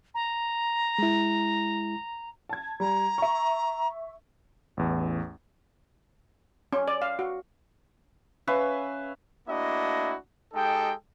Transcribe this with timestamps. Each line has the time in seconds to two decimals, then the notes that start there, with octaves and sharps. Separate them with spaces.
0.14 A#5
0.98 G#3 E4
2.49 A5 G#6
2.80 G3 A#5
3.18 E5 C#6
4.77 A1 E2
6.73 C#4
6.88 D5
7.02 F5
7.19 F#4
8.47 C#4 B4 E5 F5
9.48 A3 A#3 D4 E4 F#4 D#5
10.54 G#3 D#4 G4 A4 G5